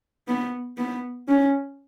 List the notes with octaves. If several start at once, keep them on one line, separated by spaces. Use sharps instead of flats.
B3
B3
C#4